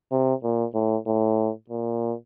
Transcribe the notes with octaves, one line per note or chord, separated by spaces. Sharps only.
C3
A#2
A2
A2
A#2